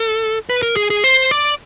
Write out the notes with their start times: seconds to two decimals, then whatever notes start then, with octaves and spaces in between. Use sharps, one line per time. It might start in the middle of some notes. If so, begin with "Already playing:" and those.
Already playing: A4
0.49 B4
0.63 A#4
0.76 G#4
0.90 G#4
1.04 C5
1.31 D5